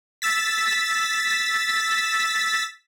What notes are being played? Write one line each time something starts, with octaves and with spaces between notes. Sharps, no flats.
E6 A6 B6